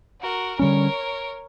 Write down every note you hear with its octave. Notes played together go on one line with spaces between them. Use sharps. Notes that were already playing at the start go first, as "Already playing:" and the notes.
F#4 A#4
D3 G3 C#4 A#4 C#5